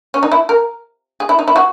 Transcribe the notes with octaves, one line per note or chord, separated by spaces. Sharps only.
C#4
D#4
E4
A#4
G#4
E4
D#4
E4
F#4